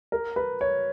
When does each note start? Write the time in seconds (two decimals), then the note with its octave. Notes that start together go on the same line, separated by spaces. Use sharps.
0.12 A#4
0.36 B4
0.61 C#5